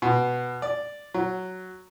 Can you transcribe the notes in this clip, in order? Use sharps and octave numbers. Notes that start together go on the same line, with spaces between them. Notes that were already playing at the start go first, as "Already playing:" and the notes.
B2
D5
F#3